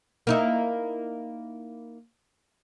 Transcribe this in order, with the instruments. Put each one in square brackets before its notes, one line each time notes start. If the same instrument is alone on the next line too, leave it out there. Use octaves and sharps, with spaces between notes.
[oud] A#3 D#4 E4